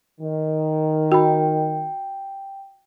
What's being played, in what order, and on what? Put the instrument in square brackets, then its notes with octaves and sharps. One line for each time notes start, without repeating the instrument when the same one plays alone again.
[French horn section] D#3
[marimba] F#4 B5 [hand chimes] G5